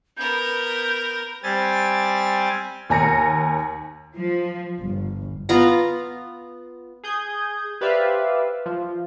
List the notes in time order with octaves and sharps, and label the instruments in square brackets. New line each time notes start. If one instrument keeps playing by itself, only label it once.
[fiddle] B3 A#4 [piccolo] G6
[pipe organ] G3 C4 G#5 A6
[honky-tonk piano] D#2 G#5 A#5 A#6 C#7
[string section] F3
G1
[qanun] B3 F4 A#5
[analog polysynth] G#4 D#6 G6 G#6
G4 B4 C5 D5 E5 F5
F3